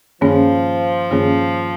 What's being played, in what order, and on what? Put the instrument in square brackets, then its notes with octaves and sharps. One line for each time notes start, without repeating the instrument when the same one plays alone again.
[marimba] G2 D#3 A#3 C#4 G#4 [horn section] F3
[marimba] G2 D#3 A#3 C#4 G#4